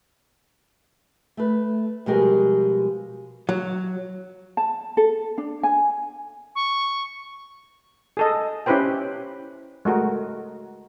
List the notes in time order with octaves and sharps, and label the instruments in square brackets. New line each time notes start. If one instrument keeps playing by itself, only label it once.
[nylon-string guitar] A3 B4
B2 F3 G3 G#3 G4 A#4
[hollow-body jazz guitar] F#3
[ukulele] A5
A4
D4
G#5
[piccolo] C#6
[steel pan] G#4 A4 D#5
C#4 E4 G4 B4 C5 G5
G#3 A3 F#4 A#4